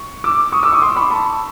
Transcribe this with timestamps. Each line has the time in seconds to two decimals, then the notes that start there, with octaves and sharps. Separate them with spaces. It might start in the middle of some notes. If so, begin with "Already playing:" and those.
Already playing: C#6
0.24 D6 E6
0.52 C#6 D#6
0.63 D6 E6
0.72 C#6 D#6
0.82 C6 D6
0.92 D6
0.96 B5 C#6
1.10 A5 B5